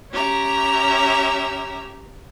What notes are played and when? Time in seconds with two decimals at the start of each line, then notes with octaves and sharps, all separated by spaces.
0.11 C#4 G4 E5 A#5